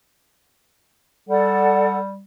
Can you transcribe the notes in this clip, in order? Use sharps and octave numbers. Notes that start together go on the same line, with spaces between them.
G3 A4 D5 F#5